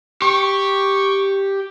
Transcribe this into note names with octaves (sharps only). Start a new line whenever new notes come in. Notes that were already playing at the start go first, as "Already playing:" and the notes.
G4 C#6